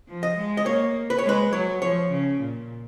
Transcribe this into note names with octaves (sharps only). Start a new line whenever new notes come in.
F3
D#5
G#3
D#5
A#3 C#5
B4
C#5
G#3
B4
F#3 C#5
F3 C#5
C#3
A#2